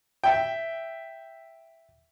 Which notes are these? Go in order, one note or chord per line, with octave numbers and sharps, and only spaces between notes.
E5 G5